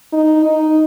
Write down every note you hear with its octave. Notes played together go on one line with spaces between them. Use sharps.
D#4
D#4